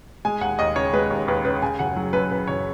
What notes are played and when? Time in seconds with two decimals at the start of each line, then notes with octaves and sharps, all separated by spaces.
0.25 G#3 G#5
0.41 D#2 F#5
0.59 D#2 D#5
0.76 C#3 C#5
0.93 G#3 B4
1.10 D#2
1.28 D#2 B4
1.45 C#3 B4
1.62 C#3 G#5
1.79 F#1 F#5
1.96 F#3
2.13 F#2 B4
2.31 C#3 B4
2.48 F#1 C#5